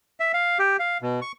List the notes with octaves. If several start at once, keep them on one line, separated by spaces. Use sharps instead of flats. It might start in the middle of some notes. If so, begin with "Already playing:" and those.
E5
F5
G4
F5
B2
C#6